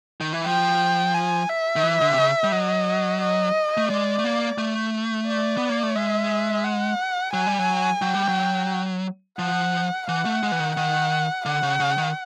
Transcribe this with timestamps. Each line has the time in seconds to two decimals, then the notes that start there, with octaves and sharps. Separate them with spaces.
0.21 D#3
0.33 E3
0.46 F3 G5
1.14 G#5
1.49 E5
1.76 D#3
1.83 E3
2.01 D3
2.10 C3
2.18 C#3
2.44 G3
2.52 F#3 D#5
3.21 D#5
3.77 A3
3.90 G#3 D5
4.19 A3
4.24 A#3
4.58 A3
5.27 D5
5.57 B3
5.69 A#3
5.83 A3
5.96 G#3 E5
6.64 F#5
7.33 F#3 G#5
7.47 G3
7.59 F#3
8.02 F#3 G5
8.15 G3
8.28 F#3
9.39 F3 F#5
10.08 E3 F#5
10.25 A3
10.43 G#3
10.52 E3
10.60 D#3
10.77 D#3 F#5
11.46 D3 F#5
11.63 C#3
11.80 C#3
11.98 D#3